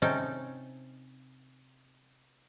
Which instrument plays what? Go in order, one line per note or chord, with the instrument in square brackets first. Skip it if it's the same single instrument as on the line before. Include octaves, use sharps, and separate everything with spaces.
[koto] C3 C#4 D#4 A4 G5